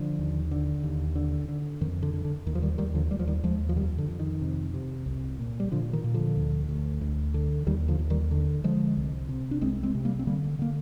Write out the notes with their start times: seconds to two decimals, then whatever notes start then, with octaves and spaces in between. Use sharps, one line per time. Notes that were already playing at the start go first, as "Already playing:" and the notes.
Already playing: D3 F3
0.18 D#2
0.51 D3
0.83 D#2
1.16 D3
1.49 D3
1.81 F2 D#3
2.02 D3
2.14 D3
2.25 D3
2.46 D#2 D#3
2.55 F3
2.62 D#3 G3
2.78 D#2 D#3 G3
2.95 D3 F3
3.11 D#2 G3
3.19 F3
3.27 D#3 G3
3.43 D#2 F3 G#3
3.69 F3
3.76 F2 D#3 G3
3.98 D3
4.08 F2
4.20 D#3
4.41 C3
4.74 C3
5.06 C2
5.39 A#2
5.60 G3
5.72 A#2 D3 F3
5.93 D#3
6.04 A#2
6.14 D3 F3
6.36 D2
6.69 D2
7.01 D2
7.34 D3
7.67 D#2 D#3 G3
7.88 D3 F3
7.99 D#2
8.10 D#3 G3
8.31 D3
8.64 D3 F3 G#3
8.97 C2
9.29 C3
9.51 D4
9.61 C2 G#3 C4
9.83 G#3 C4
9.95 C3
10.05 G3 A#3
10.19 C4
10.27 D3 G3 A#3
10.59 D3 A#3